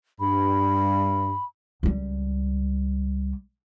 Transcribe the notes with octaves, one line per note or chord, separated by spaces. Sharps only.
G2 B5
C#2 G3